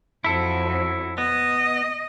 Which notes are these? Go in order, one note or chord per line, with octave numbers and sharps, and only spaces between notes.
F2 F#3 E4 A4
B3 D#5